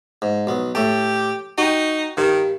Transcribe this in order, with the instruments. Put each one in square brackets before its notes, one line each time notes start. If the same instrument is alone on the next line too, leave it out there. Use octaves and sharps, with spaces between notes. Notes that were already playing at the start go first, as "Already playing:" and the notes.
[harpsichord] G#2
B1 B3
[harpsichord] A2 A3 A5 [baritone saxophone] G4
[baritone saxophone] D#4 [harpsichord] F#4 G5
[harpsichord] G2 [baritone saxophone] D#3